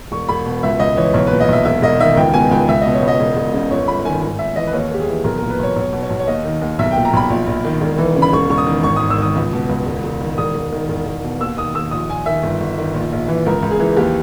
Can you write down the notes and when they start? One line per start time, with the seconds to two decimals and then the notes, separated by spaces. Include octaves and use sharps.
0.12 E1 C#6
0.29 E1 B5
0.46 B2
0.63 C#2 E5
0.80 C#2 D#5
0.97 E3 C#5
1.14 B1 C#5
1.27 A#2 B4
1.40 D#5
1.49 B1 E5
1.65 E1 E5
1.82 E1 D#5
1.99 D#3 E5
2.16 C#2 G5
2.34 B2 G#5
2.51 C#2 G5
2.68 C#2 E5
2.82 B2 D#5
2.94 C#5
3.02 C#2
3.08 D#5
3.20 E1
3.37 E1
3.54 C#3
3.70 G1 C#5
3.88 G1 B5
4.05 D#3 G#5
4.22 G#1 G#5
4.39 G#1 E5
4.56 E3 D#5
4.67 B4
4.73 D#2 C#5
4.91 D#2 G4
5.00 G#4
5.08 E3
5.24 B1 A#4
5.38 A#2 A#4
5.50 B4
5.59 B1 C#5
5.76 B1 C#5
5.93 B2
6.02 C#5
6.10 B1
6.19 C#5
6.27 D#2 D#5
6.45 D#3
6.62 D#2
6.79 B1 E5
6.91 A#2 G5
7.05 A#5
7.13 B1 B5
7.30 A#1
7.47 A#1
7.65 D#3
7.81 E1
7.98 E3
8.16 C#3
8.22 B5
8.33 E1 C#6
8.50 E1 C#6
8.58 D#6
8.67 D#3
8.83 G#1 C#6
8.96 G#1 D#6
9.10 E6
9.18 D#3 D#6
9.36 C#2
9.53 B2
9.69 C#2
9.86 E1
10.04 E1
10.21 D#3
10.38 E1 D#6
10.55 E1
10.72 D#3
10.89 E1
11.06 E1
11.24 B2
11.40 D#2 E6
11.58 D#3 D#6
11.75 D#2 E6
11.91 A#1 D#6
12.09 A#1 G#5
12.26 D#3 E5
12.43 G1
12.61 G1
12.78 D#3
12.94 A#1
13.12 A#1
13.28 E3
13.46 C#2 A#4
13.62 C#2
13.71 G#4
13.80 E3
13.97 D#2 G4